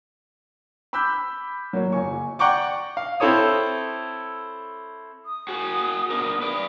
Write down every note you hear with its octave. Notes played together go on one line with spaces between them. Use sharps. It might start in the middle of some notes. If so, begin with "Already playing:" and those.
B5 D6 E6 F#6 G6 B6
F#3 A#3 C#5
F#1 G#5 C#6
D5 F#5 G5 A#5 C#6 D6
F5
C4 E4 A4 C#5 D#6
D#6
F#4 G#4
B3 D4 A#4
B4 D5